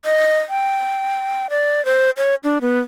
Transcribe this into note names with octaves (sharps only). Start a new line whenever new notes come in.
D#5
G5
D5
C5
C#5
D4
B3